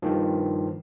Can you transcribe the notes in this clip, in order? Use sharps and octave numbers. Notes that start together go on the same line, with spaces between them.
G2 D#3 F3